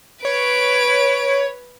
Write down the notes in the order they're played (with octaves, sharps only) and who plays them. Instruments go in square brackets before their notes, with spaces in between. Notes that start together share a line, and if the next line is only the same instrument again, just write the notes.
[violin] B4 D7 [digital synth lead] C#5